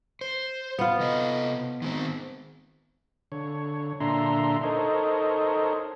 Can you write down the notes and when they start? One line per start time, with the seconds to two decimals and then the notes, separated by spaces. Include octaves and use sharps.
0.21 C5
0.79 B3 F4
1.00 C3 A4 D#5
1.82 D#3 G#3 C4
3.32 D3 C#5
4.00 A#2 D3 D4 E5 A#5 C6
4.63 D#4 A4 A#4 C5 C#5 D#5